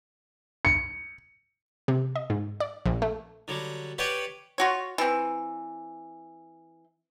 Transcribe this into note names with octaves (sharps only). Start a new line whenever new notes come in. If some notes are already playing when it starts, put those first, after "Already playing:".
C#7
C3
D#5
G#2
D5
A#1
A3
D3 F#3 G3
G4 B4 C#5 D5 F#5 G5
F4 F#4 C#5
E3 C4